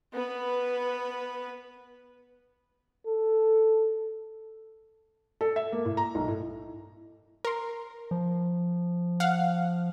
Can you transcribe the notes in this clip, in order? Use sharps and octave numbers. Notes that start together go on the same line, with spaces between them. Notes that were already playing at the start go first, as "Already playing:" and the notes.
B3 B4
A4
A4
E5
A#3
A2
A#5
B1
A2
A#4 C6
F3
F5 F#5